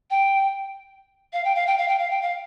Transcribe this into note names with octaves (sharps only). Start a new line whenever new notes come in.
G5
F5
G5
F5
G5
F5
G5
F5
G5
F5